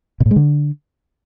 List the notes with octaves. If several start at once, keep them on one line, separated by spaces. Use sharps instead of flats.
B2
A2
G#3
D3